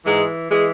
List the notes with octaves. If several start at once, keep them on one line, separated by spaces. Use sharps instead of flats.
G#2 E3 G#3
E3 G#3